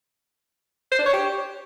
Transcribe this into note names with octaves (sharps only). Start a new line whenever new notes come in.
C5
D4
C#5
G4